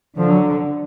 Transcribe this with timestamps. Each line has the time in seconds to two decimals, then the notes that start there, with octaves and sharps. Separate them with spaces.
0.17 D3 F3
0.30 F#3